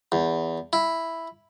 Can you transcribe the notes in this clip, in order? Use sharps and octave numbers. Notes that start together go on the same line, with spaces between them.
E2
E4